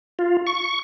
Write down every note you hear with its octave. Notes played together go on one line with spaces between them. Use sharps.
F4
C#6